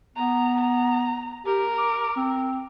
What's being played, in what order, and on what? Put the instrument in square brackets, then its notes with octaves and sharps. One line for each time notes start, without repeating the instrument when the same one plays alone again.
[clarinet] B3 [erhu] A#5
[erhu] A#5
[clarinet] G4 [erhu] A#4
[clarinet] D6
C4